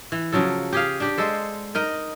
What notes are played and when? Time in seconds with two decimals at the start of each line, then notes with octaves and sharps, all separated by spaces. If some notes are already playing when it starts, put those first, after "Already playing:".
0.12 E3
0.32 C#3 F3 F#3 A4
0.73 G4 G#4 F5
1.00 D4 G4
1.18 G#3 A4 C5
1.75 D#4 A#4 D#5